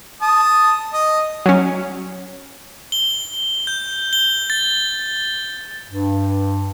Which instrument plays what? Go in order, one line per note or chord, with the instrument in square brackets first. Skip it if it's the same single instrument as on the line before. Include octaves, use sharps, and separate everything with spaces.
[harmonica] A5 D#6
D#5
[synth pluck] F#3 C#4
[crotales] G7
G6
G7
A6
[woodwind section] G2